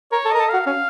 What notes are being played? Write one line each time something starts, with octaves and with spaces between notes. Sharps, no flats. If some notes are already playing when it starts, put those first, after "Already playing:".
A#4 C#5
A4
A#4 D#5
A4
F#4 F5
C#4 F5